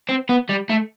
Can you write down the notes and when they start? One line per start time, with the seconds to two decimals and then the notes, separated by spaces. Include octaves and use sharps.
0.09 C4
0.29 B3
0.49 G3
0.70 A3